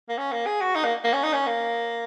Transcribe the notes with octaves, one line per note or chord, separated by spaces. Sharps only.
A#3
C#4
A#3
G#4
F#4
D#4
A#3
A#3
C#4
D#4
C#4
A#3